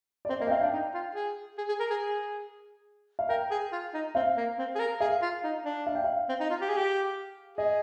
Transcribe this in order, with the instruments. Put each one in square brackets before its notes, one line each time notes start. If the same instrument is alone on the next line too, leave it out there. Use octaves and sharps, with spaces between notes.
[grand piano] D5
[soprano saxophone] C4 [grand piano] C5
[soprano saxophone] A#3 [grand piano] D#5
[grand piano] G5
[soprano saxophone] C4 [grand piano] F5
[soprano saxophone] D4 [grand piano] G5
[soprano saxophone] D#4
F4
G#4
G#4
G#4
A#4
G#4
G#4
[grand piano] F5
[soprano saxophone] A#4 [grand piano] G5
[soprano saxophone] G#4
F4
D#4
[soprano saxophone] C4 [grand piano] F5
[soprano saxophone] A#3
C4
G#4
A#4
[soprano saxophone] G#4 [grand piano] F5
[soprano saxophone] F4
D#4
D4
[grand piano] F5
G5
F5
[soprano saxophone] C4
D#4
F4
G4
G#4
G4
[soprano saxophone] G#4 [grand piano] D#5